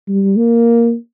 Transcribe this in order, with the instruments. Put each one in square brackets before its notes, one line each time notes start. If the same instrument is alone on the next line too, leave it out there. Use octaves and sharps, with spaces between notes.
[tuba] G3
A#3